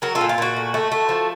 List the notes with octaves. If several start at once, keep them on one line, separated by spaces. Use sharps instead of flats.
F#3 F#4 A#4
F4 A4
A#2
F4
A#2 F#4
A3
A3
A3
F3